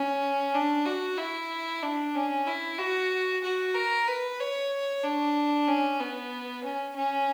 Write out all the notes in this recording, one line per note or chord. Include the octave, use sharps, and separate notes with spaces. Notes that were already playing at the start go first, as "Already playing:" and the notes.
Already playing: C#4
D4
F#4
E4
D4
C#4
E4
F#4
F#4
A#4
B4
C#5
D4
C#4
B3
C#4
C#4